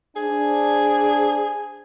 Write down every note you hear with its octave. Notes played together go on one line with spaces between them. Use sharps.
D4 G#4 C5 G#5